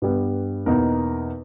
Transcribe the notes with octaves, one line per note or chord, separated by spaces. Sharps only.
G2 G3 B3
E2 B2 A#3 D#4 A#4